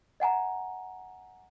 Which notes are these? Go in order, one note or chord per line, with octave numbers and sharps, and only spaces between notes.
D#5 F#5 G#5 A#5